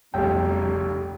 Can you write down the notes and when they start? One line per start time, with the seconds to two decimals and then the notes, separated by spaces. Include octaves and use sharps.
0.14 F1 B1 F2 C#3 G3 G4 G5